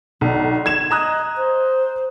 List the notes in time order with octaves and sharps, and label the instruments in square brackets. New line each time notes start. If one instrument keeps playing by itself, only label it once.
[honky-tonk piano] B1 [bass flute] D3
[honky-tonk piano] G#6 E7
[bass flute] D#5 [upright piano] A#5 D#6 F#6
[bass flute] C5